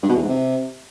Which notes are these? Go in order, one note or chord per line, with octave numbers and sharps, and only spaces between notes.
G2
B2
E2
G#2
C3